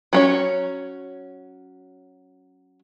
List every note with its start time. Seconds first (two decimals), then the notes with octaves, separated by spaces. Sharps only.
0.13 F#3 C#4 C#5